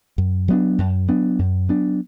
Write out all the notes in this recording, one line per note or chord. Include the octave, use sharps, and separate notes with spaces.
F#2
F#3 B3 D4
F#2
F#3 B3 D4
F#2
F#3 B3 D4